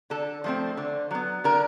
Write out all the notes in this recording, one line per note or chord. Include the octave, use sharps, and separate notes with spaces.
D3 A4
F3 A3 C4
D3
F#3 B3
D3 A#4